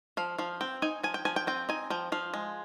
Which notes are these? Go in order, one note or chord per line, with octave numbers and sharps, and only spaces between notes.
F3 F5
F3 F5
C4 G5
D#4 G#5
F3 G#5
G5
F3 G#5
G5
C4 G5
D#4 G#5
F3 G5
F3 F5
G#3